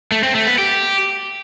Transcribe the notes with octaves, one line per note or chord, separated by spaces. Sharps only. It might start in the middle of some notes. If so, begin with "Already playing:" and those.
A3
C4
A3
B3
G4